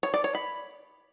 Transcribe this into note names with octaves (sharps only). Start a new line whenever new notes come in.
C#5
D5
C#5
B5